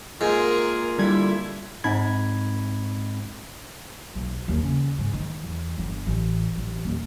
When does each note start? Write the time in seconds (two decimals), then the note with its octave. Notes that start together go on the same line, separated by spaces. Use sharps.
0.21 G#2 A#3 F4 G#4 A#4
0.98 D3 G3 E4 G#6
1.84 G#2 G#3 C4 D#4 B5 G#6
4.15 B1
4.48 D#2
4.63 C#3
4.98 G#2
5.13 D#3
5.43 E2
5.78 G1
6.07 A1
6.57 A1
6.85 D#1